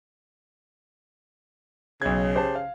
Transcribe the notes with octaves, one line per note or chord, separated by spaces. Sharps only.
B1 C#3 G#6
G4 C5 A5
F5